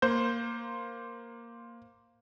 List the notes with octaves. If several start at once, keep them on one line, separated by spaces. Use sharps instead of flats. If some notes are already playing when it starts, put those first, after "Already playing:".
A#3 C5 G6